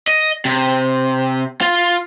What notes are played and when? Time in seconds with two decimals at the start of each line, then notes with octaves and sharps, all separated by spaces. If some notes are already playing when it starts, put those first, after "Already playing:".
0.08 D#5
0.45 C3
1.61 F4